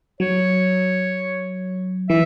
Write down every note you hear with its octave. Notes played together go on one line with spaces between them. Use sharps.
F#3 C#5
E3 E5